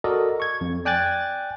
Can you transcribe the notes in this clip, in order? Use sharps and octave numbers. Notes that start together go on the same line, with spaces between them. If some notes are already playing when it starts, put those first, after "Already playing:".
F#4 A4 A#4 D5 D#5
C#6 G#6
F2
D5 G5 G#5 F#6 G#6 A6